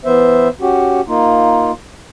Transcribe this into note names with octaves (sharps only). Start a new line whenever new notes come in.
E3 B3 C5 E5
C#4 F#4 G4
A#3 D#4 F4